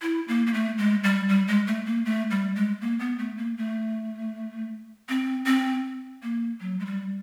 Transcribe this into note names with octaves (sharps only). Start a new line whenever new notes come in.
E4
A#3
A#3
A3
G#3
G3
G3
G#3
A3
A#3
A3
G3
G#3
A#3
B3
A3
A#3
A3
C4
C4
A#3
F#3
G#3
G3